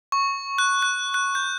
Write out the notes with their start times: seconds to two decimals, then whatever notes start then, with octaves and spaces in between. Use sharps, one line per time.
0.12 C#6
0.58 F#6
0.82 F#6
1.14 F#6
1.35 G6